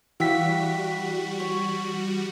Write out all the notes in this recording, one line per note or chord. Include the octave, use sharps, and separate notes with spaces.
E3 G3 F#4 G4 E5 F5 B6
C#5